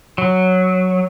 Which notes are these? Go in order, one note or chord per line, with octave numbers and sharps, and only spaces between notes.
F#3